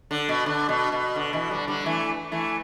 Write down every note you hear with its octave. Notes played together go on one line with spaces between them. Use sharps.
D3
B2
D3
B2
B2
D3
B2 E3
D3 G3
D3 G3
E3 A3
E3 A3